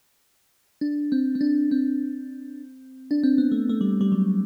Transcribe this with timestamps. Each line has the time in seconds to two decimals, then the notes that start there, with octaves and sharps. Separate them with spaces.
0.81 D4
1.12 C4
1.35 C4
1.41 D4
1.71 C4
3.11 D4
3.23 C4
3.38 B3
3.52 A3
3.69 A3
3.81 G3
4.01 G3
4.12 F#3